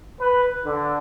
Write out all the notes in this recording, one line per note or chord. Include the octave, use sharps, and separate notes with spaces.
B4
D3